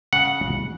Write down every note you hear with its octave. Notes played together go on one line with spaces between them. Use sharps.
C#3 F#5